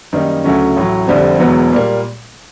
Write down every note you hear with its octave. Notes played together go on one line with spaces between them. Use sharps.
F#2 D#3 G3 A#3 D#4
D2 C#3 F#3 A3 C#4
A1 A2 F#3
F1 F2 D3 G3 C4
E1 E2 B2 F#3 B3
A#2 G3 A#3